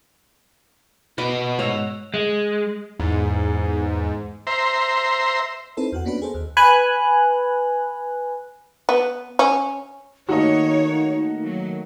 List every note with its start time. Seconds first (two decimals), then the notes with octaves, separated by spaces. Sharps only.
1.18 B2 F#4 D#5 B5 D6
1.59 G#2 C#5 F#5 A#5 E6
2.14 G#3
2.99 E2 G#2
4.47 C5 E5 A#5 C6
5.77 C4 D#4 E4 A4 B4 C5
5.92 E2 F#4 F#5
6.05 A#3 B3 C#4 D4 F#4 B4
6.22 G#4 A4 C5
6.34 D#2
6.57 B4 G#5 F#6
8.89 B3
9.39 C#4
10.29 D#3 A3 A#3 D#4 F#4 C#5 D#5
11.45 F#3